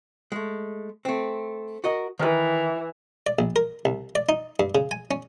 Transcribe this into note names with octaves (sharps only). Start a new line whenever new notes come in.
G#3 A3
A3 C4
F#4 A#4 D#5
D#3 E3 B4
D5
A#1
A#4
C2
D5
D#4
G2
C#3
G#5
C#4